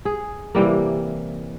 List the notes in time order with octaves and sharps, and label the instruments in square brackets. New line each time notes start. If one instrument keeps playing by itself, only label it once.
[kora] G#4
C3 E3 G3 A#3